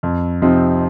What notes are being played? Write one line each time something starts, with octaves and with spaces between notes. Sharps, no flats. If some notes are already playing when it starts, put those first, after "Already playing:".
F2
C3 F3 C4 D#4